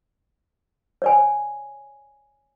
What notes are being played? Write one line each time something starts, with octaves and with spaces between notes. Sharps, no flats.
C#5 D5 G#5